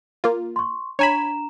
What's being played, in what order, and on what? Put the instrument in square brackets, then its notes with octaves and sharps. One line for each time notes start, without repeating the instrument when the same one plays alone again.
[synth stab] A#3 F4
[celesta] C6 C#6
[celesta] D4 A#5 E7 [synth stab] C#5 G#5 B5